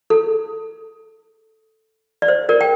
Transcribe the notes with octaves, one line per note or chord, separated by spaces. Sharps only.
A4
D5
C5
A#4 D5
G5